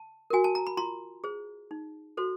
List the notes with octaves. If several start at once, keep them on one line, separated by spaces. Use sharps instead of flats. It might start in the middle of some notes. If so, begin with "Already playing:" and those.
Already playing: A5
F#4 A#4 G#5
A5
A#5
B5
F4 A#5 C6
G#4 C5
D#4
F#4 A4 C5